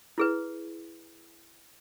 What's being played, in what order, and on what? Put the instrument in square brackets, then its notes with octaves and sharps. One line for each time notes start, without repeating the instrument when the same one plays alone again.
[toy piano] E4 G#4 B4